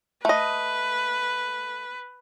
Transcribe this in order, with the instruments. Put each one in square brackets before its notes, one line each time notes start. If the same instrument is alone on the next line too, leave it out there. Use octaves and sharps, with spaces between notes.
[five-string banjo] A3 D#5 [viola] B4